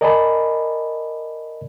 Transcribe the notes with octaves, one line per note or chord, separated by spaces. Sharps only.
A#4 D5 D#5 G#5 A5 B5